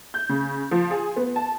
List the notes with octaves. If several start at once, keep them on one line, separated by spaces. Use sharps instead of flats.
G6
C#3
F3
G#4
B3
A5